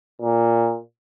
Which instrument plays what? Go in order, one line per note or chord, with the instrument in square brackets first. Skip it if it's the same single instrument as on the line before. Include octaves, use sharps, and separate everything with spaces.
[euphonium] A#2